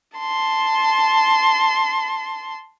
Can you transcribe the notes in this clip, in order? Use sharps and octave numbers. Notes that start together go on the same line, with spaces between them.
A5 C6